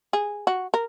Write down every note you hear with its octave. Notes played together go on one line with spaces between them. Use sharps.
G#4
F#4
A#4